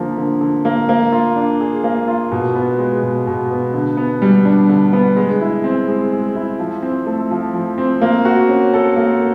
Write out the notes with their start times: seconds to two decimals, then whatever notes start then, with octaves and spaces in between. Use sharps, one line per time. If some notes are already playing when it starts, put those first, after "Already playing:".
Already playing: D3 F3 A#3
0.18 D3
0.41 D3
0.65 A#3
0.89 A#3
1.12 F4
1.36 D4
1.60 G#4
1.84 A#3
2.08 F4
2.31 B2
2.55 B3
2.78 G#3
3.02 B2
3.27 B2
3.51 B3
3.74 D3
3.97 B3
4.22 G3
4.45 D4
4.69 D3
4.93 B3
5.16 G#3
5.41 E4
5.64 C4
5.87 G#3
6.12 G#3
6.35 E4
6.59 F3
6.82 C4
7.06 A3
7.31 F3
7.54 F3
7.78 C4
8.02 A#3
8.25 F#4
8.49 C#4
8.74 A4
8.96 A#3